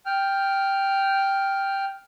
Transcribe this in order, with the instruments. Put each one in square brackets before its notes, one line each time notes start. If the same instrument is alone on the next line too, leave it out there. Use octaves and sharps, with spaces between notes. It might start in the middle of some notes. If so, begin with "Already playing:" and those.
[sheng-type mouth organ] G5 F6